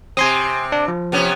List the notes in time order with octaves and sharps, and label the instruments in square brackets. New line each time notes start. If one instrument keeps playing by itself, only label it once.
[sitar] C3 C4 [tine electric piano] G#5 C6 D#6
[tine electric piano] D4
F3
[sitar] C3 B3 C#4